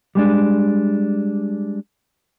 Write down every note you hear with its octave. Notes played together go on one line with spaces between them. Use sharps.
G3 G#3 D4